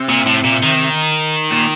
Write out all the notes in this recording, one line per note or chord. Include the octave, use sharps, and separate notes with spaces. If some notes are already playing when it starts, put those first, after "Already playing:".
Already playing: C3
A#2
A2
A#2
D#3
A#2